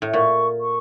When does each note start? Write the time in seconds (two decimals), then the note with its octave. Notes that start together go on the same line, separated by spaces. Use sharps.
0.02 A2
0.13 A#2 C#6
0.60 C#6